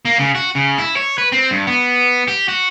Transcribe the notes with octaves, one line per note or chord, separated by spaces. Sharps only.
A#3
C#3
F#4
C#3
E4
C#5
B4
C4
G2
B3
G4
F#4